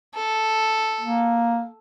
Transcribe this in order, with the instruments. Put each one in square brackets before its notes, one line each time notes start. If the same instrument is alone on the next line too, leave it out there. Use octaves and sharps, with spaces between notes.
[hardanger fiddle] A4
[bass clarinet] A#3